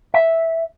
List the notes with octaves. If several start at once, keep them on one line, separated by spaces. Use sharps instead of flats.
E5